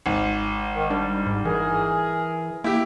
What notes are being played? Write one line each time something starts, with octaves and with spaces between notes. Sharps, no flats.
G#1
D#3
G3 D4
G#2
E3 G#4 A#4
A#3 E4 G4